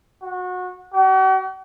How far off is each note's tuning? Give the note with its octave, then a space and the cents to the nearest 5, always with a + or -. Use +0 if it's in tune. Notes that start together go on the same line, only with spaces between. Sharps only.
F#4 -25
F#4 +45